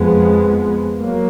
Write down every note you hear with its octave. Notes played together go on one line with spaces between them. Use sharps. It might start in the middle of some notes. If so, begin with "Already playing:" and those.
Already playing: F2 F3 G#3 B3
F#3 A#3